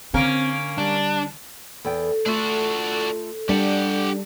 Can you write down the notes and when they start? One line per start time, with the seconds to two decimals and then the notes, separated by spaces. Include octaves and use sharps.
0.14 D3 A#3 C4 C#4 A#4
0.78 G3 D4
1.85 E2 A4 G5
2.26 A3 D4 F4 F#4
3.49 G3 D4 G4 F#5